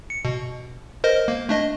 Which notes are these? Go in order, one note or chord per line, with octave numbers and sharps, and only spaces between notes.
C#7
B2
A#4 C5 D#5
A#3
A3 D4 D#5